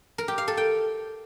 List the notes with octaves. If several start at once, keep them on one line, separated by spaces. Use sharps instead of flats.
A#4
G4
F5
A4
G5